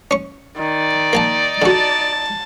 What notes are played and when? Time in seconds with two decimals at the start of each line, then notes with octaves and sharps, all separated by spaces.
0.11 C#4 C#6
0.57 D#3 D#4 D5
1.13 A#3 G#5 A5
1.62 D3 F#4 A5